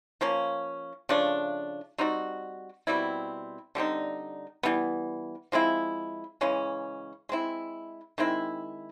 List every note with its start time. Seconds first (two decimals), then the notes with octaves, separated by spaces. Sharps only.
0.21 F3 A#3 C#4
1.09 C#3 F3 A3 D4
1.98 G3 C4 D#4 F#4
2.87 B2 G3 C4 E4
3.75 D3 G3 C4 D#4
4.63 E3 G3 B3
5.52 F3 G#3 C4 E4
6.41 C#3 E3 G#3 C#4
7.29 G#3 C4 E4
8.18 D#3 G#3 C4 E4